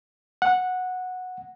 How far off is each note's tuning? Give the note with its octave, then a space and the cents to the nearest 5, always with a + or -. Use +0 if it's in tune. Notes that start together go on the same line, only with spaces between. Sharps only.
F#5 -10